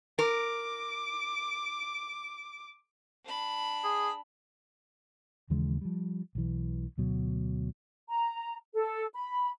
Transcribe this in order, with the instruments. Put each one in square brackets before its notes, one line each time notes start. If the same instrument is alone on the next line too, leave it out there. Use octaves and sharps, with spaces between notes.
[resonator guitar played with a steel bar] A#4 [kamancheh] D6
[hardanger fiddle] D4 B5
[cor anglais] G#4
[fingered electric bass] D#2 C#3 E3 G#3
F3 G3
B1 E3
D2 B2 F#3
[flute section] A#5
A4
B5